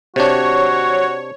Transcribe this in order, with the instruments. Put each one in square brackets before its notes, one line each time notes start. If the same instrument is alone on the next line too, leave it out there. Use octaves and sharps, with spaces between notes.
[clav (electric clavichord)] C3 D4 [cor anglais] F#4 [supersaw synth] C#5